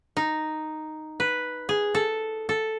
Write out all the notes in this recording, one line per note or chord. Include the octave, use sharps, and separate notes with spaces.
D#4
B4
G#4
A4
A4